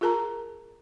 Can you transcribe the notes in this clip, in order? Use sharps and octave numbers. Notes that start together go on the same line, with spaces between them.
F4 G#4 A#4 A5 A#5